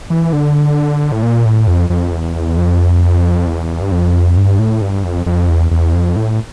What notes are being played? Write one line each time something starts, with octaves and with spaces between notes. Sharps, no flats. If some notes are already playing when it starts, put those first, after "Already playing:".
E3
D3
A2
A#2
A2
F2
F2
E2
F2
E2
G2
F2
G2
A2
G2
F2
F2
E2
E2
F2
A2